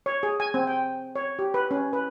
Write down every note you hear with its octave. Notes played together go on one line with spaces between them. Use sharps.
C#5
G#4
G#5
C4
G5
C#5
G4
B4
C#4
B4